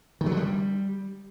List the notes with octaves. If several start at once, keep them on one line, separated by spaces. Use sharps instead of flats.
D#3
F#3
D3
G3